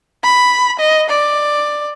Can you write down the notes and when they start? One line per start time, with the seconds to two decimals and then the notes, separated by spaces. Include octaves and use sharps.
0.23 B5
0.79 D#5
1.10 D5